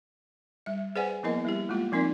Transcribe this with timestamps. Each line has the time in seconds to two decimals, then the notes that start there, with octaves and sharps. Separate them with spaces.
0.66 G3 E5
0.96 G#4 B4 C5 D5 F#5 G#5
1.23 F3 A#3 B3 E4 A#4 D#5
1.45 G3 E4 G4
1.69 G#3 A#3 F4 G4
1.92 F3 C4 D#4 A#4 D5